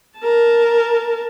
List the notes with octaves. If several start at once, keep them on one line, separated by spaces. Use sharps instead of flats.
A#4 A5